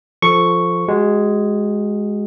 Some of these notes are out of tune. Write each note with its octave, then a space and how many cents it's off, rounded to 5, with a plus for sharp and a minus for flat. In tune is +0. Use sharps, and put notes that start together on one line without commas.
F3 +0 A4 +0 C#6 +0
G#3 +0 F#4 +25